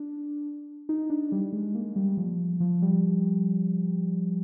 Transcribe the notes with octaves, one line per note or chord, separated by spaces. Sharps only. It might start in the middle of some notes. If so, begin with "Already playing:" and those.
Already playing: D4
D#4
D4
G3
G#3
A#3
G3
F3
F3
G3